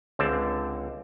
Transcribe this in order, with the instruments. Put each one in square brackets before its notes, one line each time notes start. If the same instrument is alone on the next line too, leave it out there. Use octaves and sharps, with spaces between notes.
[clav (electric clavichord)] C#2 D3 C4 A5